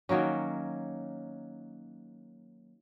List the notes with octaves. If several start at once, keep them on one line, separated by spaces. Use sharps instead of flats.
D#3 F#3 A#3 C#4